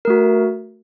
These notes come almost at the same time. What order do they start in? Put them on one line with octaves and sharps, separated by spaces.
A#4 A3 F#4